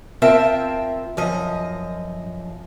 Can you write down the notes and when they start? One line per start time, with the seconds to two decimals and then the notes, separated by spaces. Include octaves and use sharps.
0.22 C4 F4 A#4 E5 G5 A5
1.17 F#2 F3 D#5